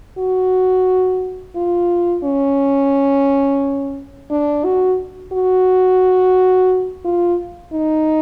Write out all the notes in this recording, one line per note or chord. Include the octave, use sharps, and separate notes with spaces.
F#4
F4
C#4
D4
F#4
F#4
F4
D#4